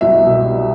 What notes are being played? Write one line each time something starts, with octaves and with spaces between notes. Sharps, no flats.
C2 E5
B2
G3